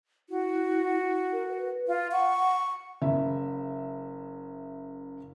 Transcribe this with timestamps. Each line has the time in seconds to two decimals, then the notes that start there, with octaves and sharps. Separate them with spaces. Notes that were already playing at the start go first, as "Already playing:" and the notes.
0.29 E4 F#4
1.32 A#4
1.48 B4
1.87 F4 F5
2.12 F#5 C#6
3.01 F#1 C#3 E5